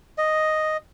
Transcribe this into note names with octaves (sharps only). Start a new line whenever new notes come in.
D#5